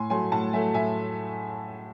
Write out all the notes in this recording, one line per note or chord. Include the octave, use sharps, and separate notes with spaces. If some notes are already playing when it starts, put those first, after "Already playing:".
Already playing: A2 G#5 C6
F#3 A3 G#5 C6
A2 F#5 A5
F#3 A3 E5 G#5
A2 E5 G#5